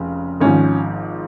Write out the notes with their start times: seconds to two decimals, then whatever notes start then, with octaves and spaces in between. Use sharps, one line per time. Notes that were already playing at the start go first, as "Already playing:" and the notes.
Already playing: F1 C#3
0.40 G#1 G#2 F3 C#4